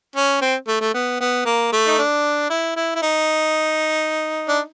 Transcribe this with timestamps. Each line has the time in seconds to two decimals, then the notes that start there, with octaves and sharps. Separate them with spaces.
0.16 C#4
0.41 C4
0.67 A3
0.81 A3
0.94 B3
1.20 B3
1.45 A#3
1.72 A3
1.87 D#4
1.98 D4
2.50 E4
2.76 E4
2.95 E4
3.02 D#4
4.48 D4